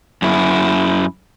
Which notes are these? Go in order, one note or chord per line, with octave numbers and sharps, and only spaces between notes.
F#2 E4